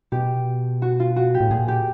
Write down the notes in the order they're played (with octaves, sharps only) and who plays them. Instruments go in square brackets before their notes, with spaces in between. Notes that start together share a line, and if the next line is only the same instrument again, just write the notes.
[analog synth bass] B2 [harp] G4
[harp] F#4
F4
F#4
G4
[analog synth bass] A2
[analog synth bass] A#2 [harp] G#4
[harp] G4